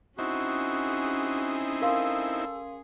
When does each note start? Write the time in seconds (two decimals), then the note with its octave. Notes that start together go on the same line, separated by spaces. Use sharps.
0.19 C4 C#4 D#4 E4 F#4 G#4
1.82 A4 A#4 F5 C6